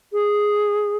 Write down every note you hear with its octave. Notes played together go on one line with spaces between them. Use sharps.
G#4